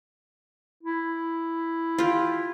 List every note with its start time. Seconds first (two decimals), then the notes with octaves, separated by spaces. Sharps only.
0.83 E4
1.99 F4 G4